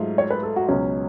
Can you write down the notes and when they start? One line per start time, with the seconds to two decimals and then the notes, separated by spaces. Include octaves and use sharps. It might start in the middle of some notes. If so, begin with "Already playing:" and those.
Already playing: G#2 F#3 A3 F4
0.18 C#5
0.31 B4
0.43 A4
0.56 F#4
0.68 C#2 B2 F#3 C#4